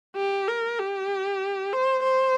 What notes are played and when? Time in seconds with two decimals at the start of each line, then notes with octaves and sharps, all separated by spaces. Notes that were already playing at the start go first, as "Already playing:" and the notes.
0.16 G4
0.48 A#4
0.79 G4
1.73 C5
2.04 C5